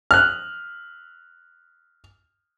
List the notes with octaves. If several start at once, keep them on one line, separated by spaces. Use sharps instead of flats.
F6 F#6